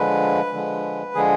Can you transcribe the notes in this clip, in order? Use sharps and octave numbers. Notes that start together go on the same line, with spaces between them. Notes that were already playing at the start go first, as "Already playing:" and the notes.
Already playing: D3 F3 G#3 B4
D3 F3 G#3
D3 F3 G#3 G#4